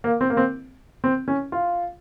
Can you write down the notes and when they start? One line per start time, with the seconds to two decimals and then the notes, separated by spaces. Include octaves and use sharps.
0.04 A#3
0.21 C4
0.30 A#3
0.37 C4
1.04 C4
1.28 C#4
1.52 F4